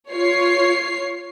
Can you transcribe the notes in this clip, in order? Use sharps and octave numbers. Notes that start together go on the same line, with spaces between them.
F4 C#5 C7